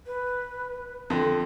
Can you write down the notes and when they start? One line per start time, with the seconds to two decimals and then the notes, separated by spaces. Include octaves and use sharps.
0.06 B4
1.10 F2 D3